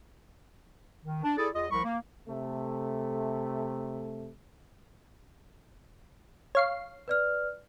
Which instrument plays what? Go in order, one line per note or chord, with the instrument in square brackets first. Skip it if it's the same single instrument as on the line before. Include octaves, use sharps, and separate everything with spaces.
[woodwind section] D#3
D4
E4 G#4 A4 D5
E2 F4 D#5
C2 F3 A#4 B5 C#6
A#3
[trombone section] C3 A3
[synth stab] C#5 F5 C7
[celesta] B4 D5 F6